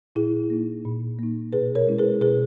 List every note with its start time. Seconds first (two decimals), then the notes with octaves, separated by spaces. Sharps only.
0.16 A#2 E4 G#4
0.50 A#3 D#4
0.85 A#2
1.19 A#3 D#4
1.53 B2 G#4 B4
1.75 A#4 C#5
1.87 G#3 C#4 E4
1.99 G#4 B4
2.21 B2 G#4 B4